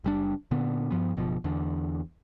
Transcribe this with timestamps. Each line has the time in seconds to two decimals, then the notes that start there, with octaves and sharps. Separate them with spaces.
0.04 F#1 G3 D4
0.51 A#2 D3 B3
0.91 G2 F3 B3
1.17 F#1 B2 F3
1.44 E2 D3